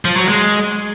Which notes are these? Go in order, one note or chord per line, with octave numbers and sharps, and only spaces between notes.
F3
F#3
G#3